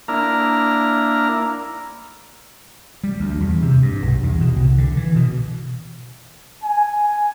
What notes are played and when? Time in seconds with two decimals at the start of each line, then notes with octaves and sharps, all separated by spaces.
0.08 A#3 D4 E4 A#5 F6
3.04 G3
3.20 D2
3.40 E2
3.62 C3
3.82 G2
4.02 B1
4.23 E2
4.40 B2
4.56 C2
4.78 D3
4.97 E3
5.15 B2
6.63 G#5